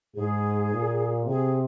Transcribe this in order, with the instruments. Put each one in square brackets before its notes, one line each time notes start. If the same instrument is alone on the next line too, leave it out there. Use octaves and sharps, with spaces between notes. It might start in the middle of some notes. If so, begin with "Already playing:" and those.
[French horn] G#2 [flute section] G#4
[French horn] A#2
[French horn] C3 [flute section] G#4